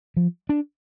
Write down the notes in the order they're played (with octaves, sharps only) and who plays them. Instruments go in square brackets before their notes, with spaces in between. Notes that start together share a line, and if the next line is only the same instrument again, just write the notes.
[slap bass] F3
D4